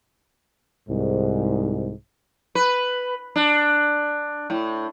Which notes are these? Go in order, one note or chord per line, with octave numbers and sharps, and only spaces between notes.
C2 G#2
B4
D4
A2